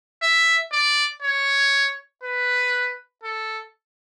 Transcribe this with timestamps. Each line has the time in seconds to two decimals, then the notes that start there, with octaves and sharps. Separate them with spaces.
0.22 E5
0.72 D5
1.22 C#5
2.24 B4
3.24 A4